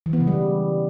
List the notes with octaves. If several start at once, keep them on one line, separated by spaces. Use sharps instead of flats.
E3
B3
C#3
G3